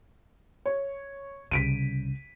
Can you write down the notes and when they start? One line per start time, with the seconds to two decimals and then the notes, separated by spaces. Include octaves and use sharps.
0.66 C#5
1.51 C2 C#3 B6 D7 D#7